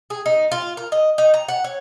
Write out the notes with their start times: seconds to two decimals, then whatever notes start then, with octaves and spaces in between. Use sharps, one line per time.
0.10 G#4
0.26 D#4
0.52 F4
0.77 A#4
0.92 D#5
1.18 D#4
1.34 A#5
1.48 F#5
1.64 C#5